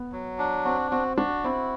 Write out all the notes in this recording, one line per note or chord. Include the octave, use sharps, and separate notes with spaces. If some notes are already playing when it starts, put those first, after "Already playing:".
Already playing: B3
F#3
D4
C4 F#4
C4 F#4
D4 F#4
C4 E4